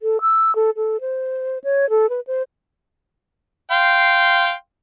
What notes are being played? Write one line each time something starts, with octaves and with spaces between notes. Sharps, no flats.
A4
E6
A4
A4
C5
C#5
A4
B4
C5
F5 G5 C6